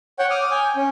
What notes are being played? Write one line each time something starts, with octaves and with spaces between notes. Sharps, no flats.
C#5 F#5 G5
D6 D#6 F6
G5 G#5
C#4